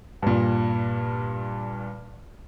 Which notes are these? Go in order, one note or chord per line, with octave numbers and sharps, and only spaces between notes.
G2 A#2